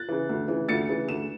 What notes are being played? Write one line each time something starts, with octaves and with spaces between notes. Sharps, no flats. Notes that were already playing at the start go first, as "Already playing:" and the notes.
Already playing: F#6 A6
C#3 E3
D2
C#3 E3
D2 A6 C#7
C#3 E3
D2 E7